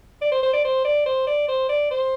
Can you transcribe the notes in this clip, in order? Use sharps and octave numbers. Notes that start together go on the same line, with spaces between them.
D5
C5
C5
D5
C5
D5
C5
D5
C5
D5
C5